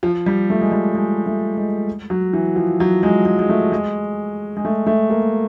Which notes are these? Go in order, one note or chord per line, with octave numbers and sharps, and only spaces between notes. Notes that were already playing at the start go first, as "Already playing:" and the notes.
F3
G3
A3
G#3
G3
G#3
A3
G#3
F#3
E3
F3
F#3
G#3
G#3
G#3
A3
G#3
G#3
A3
A3
A#3